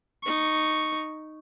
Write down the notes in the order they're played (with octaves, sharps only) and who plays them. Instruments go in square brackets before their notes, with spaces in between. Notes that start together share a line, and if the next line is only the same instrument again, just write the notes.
[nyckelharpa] D#4 C#6